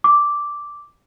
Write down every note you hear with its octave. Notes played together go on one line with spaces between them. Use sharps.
D6